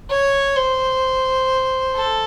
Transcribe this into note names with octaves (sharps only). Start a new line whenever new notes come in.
C#5
C5
A4